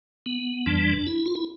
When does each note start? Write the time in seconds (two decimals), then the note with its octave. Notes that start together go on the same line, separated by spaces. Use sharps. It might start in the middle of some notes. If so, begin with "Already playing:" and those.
0.26 B3
0.66 F2 E3 G3 D4
1.07 E4
1.26 F4
1.35 E4